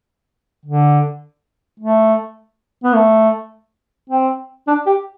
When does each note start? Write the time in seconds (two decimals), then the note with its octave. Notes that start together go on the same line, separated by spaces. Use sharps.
0.66 D3
1.80 A3
2.84 B3
2.95 A3
4.10 C4
4.68 D4
4.87 G4